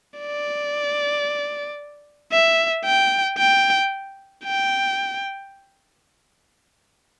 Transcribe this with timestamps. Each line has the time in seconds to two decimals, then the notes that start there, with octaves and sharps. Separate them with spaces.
0.19 D5
2.32 E5
2.85 G5
3.38 G5
4.44 G5